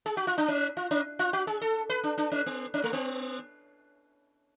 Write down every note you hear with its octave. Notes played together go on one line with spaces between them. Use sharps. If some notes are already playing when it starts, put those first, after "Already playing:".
G#4
F#4
F4
D4
C#4
F4
C#4
F4
F#4
G#4
A4
B4
D4
D4
C#4
B3
C#4
A3
B3